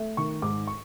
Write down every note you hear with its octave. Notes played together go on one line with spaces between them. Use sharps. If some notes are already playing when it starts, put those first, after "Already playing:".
Already playing: A3
D#3 C#6
G#2 D6
C#6